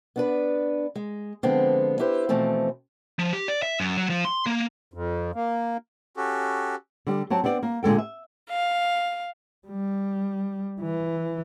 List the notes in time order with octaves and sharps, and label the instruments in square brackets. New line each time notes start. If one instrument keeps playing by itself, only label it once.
[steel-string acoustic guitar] B3 D4 B4
G#3
D3 F3 G#3 B3 C4
E4 G4 B4 C5
B2 E3 F3 A3 C4
[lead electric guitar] F3
G4
D5
E5
F#2
F#3
F3
C6
A#3
[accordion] F2
A#3
[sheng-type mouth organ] C#4 F#4 G4 A4
[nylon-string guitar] D3 G3
F#3 C4 A5
B3 C4 D4 D5
A#3
A#2 D3 G#3 A4 G5
E5
[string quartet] F5
[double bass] G3
E3